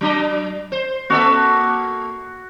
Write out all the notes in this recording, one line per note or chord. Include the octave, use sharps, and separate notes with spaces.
F#3 D4 D#5
C5
A#3 F#4 A4 E5